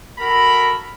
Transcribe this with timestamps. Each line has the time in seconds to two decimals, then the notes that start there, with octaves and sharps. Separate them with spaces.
0.19 F#4 A4 A#4 A#5 B5